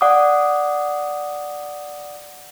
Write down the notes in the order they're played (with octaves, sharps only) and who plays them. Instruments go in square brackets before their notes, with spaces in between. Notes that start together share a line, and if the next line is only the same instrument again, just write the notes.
[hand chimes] D5 F#5 D6 D#6